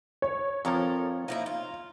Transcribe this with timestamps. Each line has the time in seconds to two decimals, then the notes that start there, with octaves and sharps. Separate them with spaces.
0.22 C#5
0.65 F2 F3 A4 A#4
1.28 F3 A#3 D#4 E4
1.46 F4